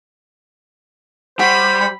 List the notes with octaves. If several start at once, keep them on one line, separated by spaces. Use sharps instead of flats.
G3 C5 F#5 B5 C#6